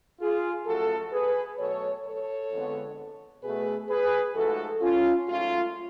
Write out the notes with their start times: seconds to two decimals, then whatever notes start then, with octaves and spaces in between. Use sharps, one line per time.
0.20 F4 G#4
0.66 F#2 F3 A3 F#4 A4
1.12 G#4 B4
1.58 B2 F#3 A3 A4 C#5
2.05 A4 C#5
2.51 F2 D3 G#3 B3
3.43 B2 A3 G#4 B4
3.89 G#4 B4
4.35 G#2 F3 A3 F#4 A4
4.81 C#4 F4
5.28 G#2 F#3 A3 C#4 F4